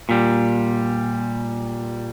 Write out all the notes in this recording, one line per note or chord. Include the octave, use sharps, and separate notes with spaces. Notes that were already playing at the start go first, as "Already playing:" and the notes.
A#2 G3